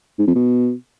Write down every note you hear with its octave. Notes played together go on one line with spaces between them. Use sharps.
G#2
F2
B2